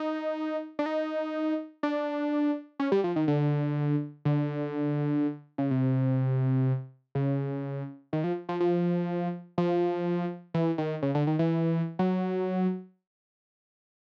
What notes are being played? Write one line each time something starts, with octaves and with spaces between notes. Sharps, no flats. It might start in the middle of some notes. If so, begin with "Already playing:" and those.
Already playing: D#4
D4
D#4
D4
C#4
G3
F3
D#3
D3
D3
C#3
C3
C#3
D#3
F3
F3
F3
F3
E3
D#3
C#3
D3
D#3
E3
F#3